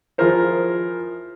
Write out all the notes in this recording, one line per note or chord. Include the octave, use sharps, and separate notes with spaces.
F3 E4 F4 G#4 A#4 C5